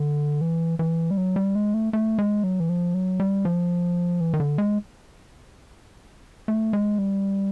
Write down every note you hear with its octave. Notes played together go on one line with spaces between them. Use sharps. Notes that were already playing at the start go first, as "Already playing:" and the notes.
Already playing: D3
E3
E3
G3
F#3
G3
G#3
A3
A3
G#3
F#3
E3
F3
F#3
G3
F3
E3
D#3
D3
G#3
A3
G#3
G3